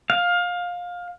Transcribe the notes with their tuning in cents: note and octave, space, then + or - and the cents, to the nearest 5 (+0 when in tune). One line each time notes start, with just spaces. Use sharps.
F5 +20